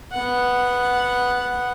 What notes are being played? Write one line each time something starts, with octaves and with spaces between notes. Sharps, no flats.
B3 F#5